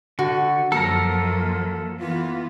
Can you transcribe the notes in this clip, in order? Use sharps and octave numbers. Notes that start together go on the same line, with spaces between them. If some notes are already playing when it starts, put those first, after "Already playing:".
D3 F#4
F#2 F3 A#3 A4 A#4 A#5
E3 B3 F4